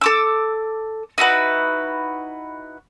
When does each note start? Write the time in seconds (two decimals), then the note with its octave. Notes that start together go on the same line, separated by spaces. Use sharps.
0.01 A4 D6 E6
1.18 D#4 E4 F#4 B4